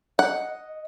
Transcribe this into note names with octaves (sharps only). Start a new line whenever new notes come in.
D#5 F#5